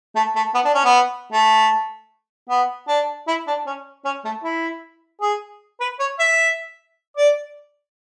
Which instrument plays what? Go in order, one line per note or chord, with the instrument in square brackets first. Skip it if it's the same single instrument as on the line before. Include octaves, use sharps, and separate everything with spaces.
[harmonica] A3
A3
B3
D4
C#4
B3
A3
B3
D4
E4
D4
C#4
C#4
A3
E4
G#4
B4
C#5
E5
D5